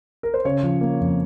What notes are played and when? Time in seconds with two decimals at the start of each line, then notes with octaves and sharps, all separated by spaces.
0.23 A#4
0.34 C5
0.45 C#3 C#5
0.63 F3
0.81 A#3
1.00 F2